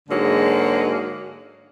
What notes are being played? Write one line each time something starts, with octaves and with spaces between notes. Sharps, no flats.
G#2 D3 F#3 G#3 A#3 G#4